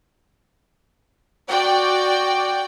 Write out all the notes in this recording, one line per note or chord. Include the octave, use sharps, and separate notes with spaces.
F#4 D5 G5